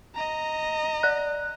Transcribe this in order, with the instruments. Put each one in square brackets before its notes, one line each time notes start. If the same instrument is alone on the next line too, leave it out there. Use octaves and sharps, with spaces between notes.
[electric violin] D#5 A#5
[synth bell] D5 F#6